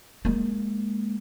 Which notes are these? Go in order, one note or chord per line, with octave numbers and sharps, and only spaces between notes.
G#3 A#3